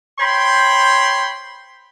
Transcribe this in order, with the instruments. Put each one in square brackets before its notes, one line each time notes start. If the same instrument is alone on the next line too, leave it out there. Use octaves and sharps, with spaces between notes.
[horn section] C5 C#5 G5 B5 C6